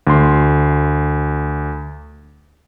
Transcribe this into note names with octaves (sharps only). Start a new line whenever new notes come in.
D2 C6